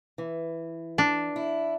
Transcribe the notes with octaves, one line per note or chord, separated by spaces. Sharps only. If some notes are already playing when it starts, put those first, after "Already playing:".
E3
D4
E4